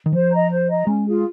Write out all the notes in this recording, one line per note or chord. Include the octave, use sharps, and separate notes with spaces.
D#3
F3 C5
D#5 A#5
C5
D#5 A#5
G#3 C#4
F4 G#4